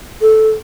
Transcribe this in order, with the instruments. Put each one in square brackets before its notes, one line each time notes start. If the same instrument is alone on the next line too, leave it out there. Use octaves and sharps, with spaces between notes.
[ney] A4